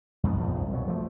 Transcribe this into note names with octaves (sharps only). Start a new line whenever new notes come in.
F2 G#2 B3
A#1 F2 G#2
C2
B2 F#3
F3 A3